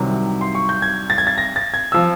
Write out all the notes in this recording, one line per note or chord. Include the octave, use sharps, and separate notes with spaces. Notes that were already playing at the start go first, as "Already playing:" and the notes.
Already playing: C2 C3 D#3 F#3
C6
C#6
G6
G#6
A6
G#6
A6
A#6
A6
G#6
F3 E6